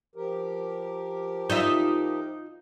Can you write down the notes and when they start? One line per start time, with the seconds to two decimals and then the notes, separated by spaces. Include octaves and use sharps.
0.15 F3 G4 A#4
1.50 D#4 F4 E5